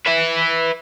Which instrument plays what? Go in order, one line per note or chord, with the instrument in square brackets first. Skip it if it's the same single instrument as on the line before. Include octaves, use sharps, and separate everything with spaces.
[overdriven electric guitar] B4 E5